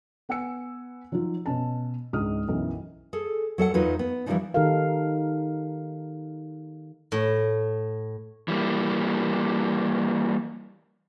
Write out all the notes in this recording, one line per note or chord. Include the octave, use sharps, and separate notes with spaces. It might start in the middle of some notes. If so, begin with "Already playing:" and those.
B3 F#5 G#5 E6 C#7
F3 F#3 D#4 F4
B2 C#4 A5
C#2 G#2 D4 D#6 F6
B1 F#2 E3
G#4 A4
F#3 A4 E5 F#5
E2 F#3 D#4 F4 B4
B3
E3 F3 G3 G#3 D4 D#4
D#3 D#4 G4 A4 A#4 F5
A2
E3 G3 A#3